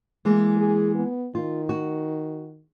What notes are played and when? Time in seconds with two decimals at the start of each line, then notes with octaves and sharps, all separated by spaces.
0.25 E3 G#3 A#3
0.58 G#4
0.95 B3
1.35 D#3 F4
1.69 F#4